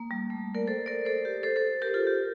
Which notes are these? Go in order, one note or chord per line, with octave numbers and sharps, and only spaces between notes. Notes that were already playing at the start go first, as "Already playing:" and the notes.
Already playing: A#3
G3
A3
A#4 D5
A4 C5
A#4 D5
A4 C5
G4 A#4
A4 C5
A4 C5
G4 A#4
F4 A4
G4
A4